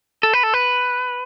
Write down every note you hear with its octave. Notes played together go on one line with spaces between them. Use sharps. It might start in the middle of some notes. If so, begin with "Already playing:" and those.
A4
B4
A4
B4